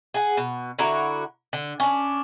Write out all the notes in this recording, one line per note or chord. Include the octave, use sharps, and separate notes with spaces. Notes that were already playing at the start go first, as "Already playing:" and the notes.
G#4 F#5
B2
D3 E4 F#4 A#5
D3
C#4 D4